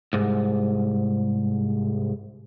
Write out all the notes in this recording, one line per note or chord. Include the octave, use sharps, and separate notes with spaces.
C2 G#2